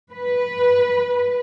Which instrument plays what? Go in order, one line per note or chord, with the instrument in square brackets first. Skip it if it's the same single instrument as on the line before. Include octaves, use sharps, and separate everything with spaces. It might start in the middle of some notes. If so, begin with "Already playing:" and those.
[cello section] B4